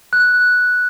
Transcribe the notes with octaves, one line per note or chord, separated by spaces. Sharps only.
F#6